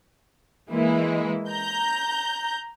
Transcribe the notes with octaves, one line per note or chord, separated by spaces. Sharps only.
E3 G#3 A#3 E4
A#5 G6